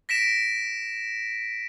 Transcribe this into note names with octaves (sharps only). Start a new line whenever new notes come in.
A#6 B6 D7 E7